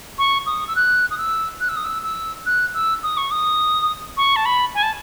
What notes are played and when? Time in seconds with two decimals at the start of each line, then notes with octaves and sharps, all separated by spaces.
0.18 C#6
0.46 D#6
0.68 E6
0.76 F#6
1.11 D#6
1.18 E6
1.61 F#6
1.69 E6
1.76 D#6
1.85 E6
2.04 E6
2.46 F#6
2.74 E6
3.03 D#6
3.17 C#6
3.31 D#6
4.17 C#6
4.36 A5
4.45 B5
4.75 G#5
4.83 A5